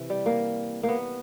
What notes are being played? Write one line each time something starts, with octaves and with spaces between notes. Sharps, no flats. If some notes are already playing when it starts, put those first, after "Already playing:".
Already playing: C3 E3
G3
A#3
A#3
B3